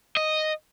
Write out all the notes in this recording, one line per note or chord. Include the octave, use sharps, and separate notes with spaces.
D#5